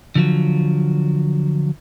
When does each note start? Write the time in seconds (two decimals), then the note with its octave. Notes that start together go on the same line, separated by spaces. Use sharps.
0.15 D3 F3 F#3